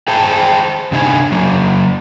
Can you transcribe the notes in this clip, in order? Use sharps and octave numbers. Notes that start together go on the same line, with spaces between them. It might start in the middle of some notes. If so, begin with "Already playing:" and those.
G#4 C5 G5 A5
C3 D4 D#4 C#5 G#5
F#3 A#3